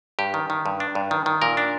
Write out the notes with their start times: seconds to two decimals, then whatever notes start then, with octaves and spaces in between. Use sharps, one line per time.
0.19 G2 G4
0.34 D#3
0.50 D#3
0.66 G2
0.80 D4
0.95 G2
1.11 D#3
1.26 D#3
1.42 A#2 A#4
1.57 D4